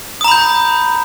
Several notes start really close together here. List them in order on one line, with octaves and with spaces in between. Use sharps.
D#6 A#5 B5 G6